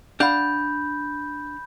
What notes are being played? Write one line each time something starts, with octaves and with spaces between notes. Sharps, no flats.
D4 F5 F#5 B5 G6